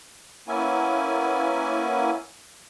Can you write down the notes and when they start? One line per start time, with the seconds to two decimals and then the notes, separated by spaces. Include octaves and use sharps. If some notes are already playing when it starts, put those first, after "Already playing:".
0.48 A#3 B3 C#4 E4 G#5